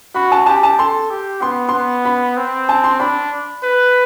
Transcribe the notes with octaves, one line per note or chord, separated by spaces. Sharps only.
F#4 B5
A5
G4 A5
A5
A4 C6
G4
B3 C6
C6
B3
B5
C4
A5
C6
D4 B5
B4